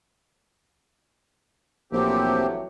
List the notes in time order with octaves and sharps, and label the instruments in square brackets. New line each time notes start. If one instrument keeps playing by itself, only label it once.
[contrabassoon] A#1 [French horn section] E3 F#3 A3 [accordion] C4 G4